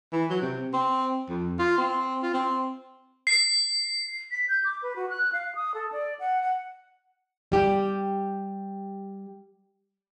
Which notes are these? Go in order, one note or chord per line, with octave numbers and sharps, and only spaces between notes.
E3
F#3
C3
C4
F2
F4
C4
F4
C4
C7
B6
G6
D6
B4
F#4
F#6
F5
D#6
A4
D5
F#5
F#5
G3 G4